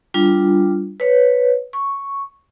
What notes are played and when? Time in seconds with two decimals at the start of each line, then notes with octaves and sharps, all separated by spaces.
0.14 G3 D4 F4
1.00 B4 C#5
1.73 C#6